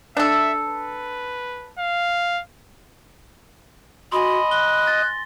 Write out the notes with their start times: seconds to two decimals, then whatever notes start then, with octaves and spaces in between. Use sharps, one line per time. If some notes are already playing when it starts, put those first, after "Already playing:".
0.17 D4 A4 E5
0.67 B4
1.79 F5
4.12 F#4 D#5 G#5 B5 C6
4.51 F#6 G7
4.87 A6 A#6